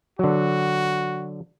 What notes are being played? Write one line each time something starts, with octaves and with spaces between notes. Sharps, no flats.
D3 F#3 F#4